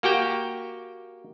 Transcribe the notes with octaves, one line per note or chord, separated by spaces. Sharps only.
A#3 F#4 G4 G5